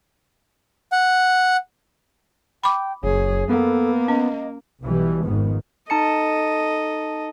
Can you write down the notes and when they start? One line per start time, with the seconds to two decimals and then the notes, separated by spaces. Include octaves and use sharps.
0.92 F#5
2.63 G5 B5 D6
3.03 F#1 F#2 G#4 C#5
3.49 A#3 B3 A4
4.08 C#4 D#5
4.81 B1 B2 E3 G3
5.24 G#1 F2 G#2 D#3 B3
5.90 D#4 A4 D#5 A5 C#7